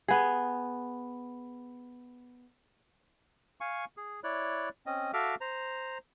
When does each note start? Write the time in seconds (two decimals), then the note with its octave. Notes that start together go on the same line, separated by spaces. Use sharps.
0.08 B3 G#4
3.61 F5 G#5 C#6
3.97 G#4
4.24 E4 C#5 D5 F#6
4.86 C4 C#4 D#5
5.13 F#4 A4 E5 F5 D6 F6
5.41 C5 A#5